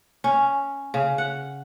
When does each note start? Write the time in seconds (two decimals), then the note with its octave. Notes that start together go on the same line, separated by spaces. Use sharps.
0.24 C#4
0.94 C#3
1.18 F#5